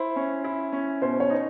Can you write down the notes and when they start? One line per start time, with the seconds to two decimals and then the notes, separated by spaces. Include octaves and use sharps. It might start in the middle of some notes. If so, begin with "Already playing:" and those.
Already playing: E4 C5
0.16 C#4
0.44 E4
0.73 C#4
1.02 B2 C5
1.20 C#5
1.30 D#4